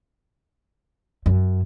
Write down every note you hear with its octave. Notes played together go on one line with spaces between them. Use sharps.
F#2